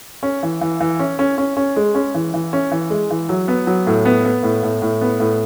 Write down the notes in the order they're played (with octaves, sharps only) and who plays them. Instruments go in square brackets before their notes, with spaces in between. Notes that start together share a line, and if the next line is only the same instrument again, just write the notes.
[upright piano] C#4
E3
E3
E3
C#4
C#4
C#4
C#4
G#3
C#4
E3
E3
C#4
E3
G#3
E3
F#3
B3
F#3
A2
B3
B3
A2
A2
A2
B3
A2